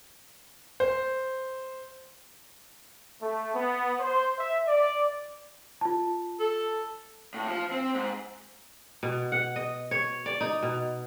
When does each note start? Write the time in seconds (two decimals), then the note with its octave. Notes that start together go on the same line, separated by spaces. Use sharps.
0.80 C5
3.22 A3
3.55 B3
4.00 C5
4.38 E5
4.68 D5
5.81 F4 A5
6.40 A4
7.34 A2
7.48 F3
7.72 C4
7.95 G#2
9.03 B2
9.32 F#5
9.56 D#5
9.91 C#5
10.26 D5
10.41 D#4
10.63 B2